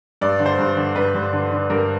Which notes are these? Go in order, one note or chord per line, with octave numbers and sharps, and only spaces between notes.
G2 D5
D3
C5
G2
D3
G2 B4
G2
D3
D3
G2 A#4